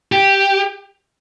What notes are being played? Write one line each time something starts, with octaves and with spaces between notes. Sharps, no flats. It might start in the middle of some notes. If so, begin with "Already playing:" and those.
G4